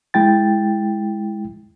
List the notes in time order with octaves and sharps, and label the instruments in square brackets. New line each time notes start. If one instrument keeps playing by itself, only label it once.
[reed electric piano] G#3 E4 G5 A6